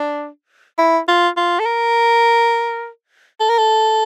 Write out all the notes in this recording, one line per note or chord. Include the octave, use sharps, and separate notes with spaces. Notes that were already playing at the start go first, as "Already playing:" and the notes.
Already playing: D4
E4
F4
F4
A4
A#4
A4
A#4
A4